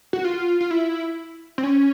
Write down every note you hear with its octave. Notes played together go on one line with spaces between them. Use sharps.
F#4
F4
F4
E4
C4
C#4